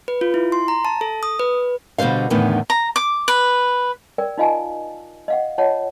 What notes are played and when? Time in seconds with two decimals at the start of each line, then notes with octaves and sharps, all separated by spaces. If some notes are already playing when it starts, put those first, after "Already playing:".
0.08 B4
0.21 F4
0.34 E4
0.52 C6
0.68 A#5
0.85 A5
1.01 A4
1.23 D#6
1.39 B4
1.98 B2 D3 G3 C5 F5
2.30 E2 A2 D3 D#3 B3
2.70 A#5
2.96 D6
3.28 B4
4.18 A#4 D5 G5
4.38 D#4 F4 D#5 F5 G#5 A5
5.28 D#5 F5 F#5
5.58 F4 C#5 D#5 F#5 A5